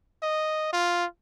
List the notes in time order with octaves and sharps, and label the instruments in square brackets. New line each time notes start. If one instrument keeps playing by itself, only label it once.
[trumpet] D#5
F4